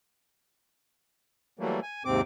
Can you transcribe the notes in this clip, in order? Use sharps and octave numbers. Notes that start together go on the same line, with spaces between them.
E3 F#3 G3 A3 A#3
G#5
D#2 G#2 C3 C4 D6